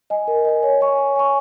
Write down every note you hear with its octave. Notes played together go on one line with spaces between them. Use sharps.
D#5 G#5
A#4
D#5 G#5
C#5
G#5 C#6
C#5
G#5 C#6